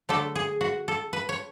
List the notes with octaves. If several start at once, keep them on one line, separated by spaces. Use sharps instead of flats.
D3 F#3 A3 A4
G#4
F#4
A4
B4
C#5